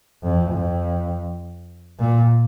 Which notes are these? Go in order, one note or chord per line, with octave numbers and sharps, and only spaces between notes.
F2
F2
A#2